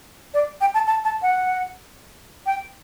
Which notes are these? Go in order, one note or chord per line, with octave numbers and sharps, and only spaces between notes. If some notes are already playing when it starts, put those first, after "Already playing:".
D5
G5
A5
A5
A5
F#5
G5